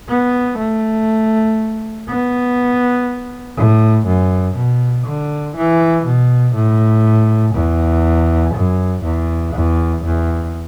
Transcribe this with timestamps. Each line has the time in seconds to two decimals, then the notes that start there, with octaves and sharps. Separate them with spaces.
0.09 B3
0.58 A3
2.08 B3
3.57 A2
4.07 F#2
4.56 B2
5.07 D3
5.56 E3
6.06 B2
6.55 A2
7.55 E2
8.55 F#2
9.04 E2
9.55 E2
10.04 E2